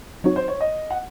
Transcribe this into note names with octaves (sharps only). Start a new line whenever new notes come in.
F#3 C4 D#4 F#4 C#5
C5
C#5
D#5
F#5